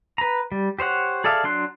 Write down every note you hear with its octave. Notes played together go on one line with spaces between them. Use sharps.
B4 A#5
G3
G4 C5 C#5 F#5
G#4 A4 D5 E5 F5
F#3 D4 C6 F#6